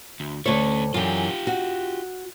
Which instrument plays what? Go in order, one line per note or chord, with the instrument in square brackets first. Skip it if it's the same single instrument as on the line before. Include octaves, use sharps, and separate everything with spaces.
[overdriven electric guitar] D2
[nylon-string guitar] D2 C#5 [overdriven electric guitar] A3 C#4
[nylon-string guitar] F#2 E3 [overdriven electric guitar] F4 G4
[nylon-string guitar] F#4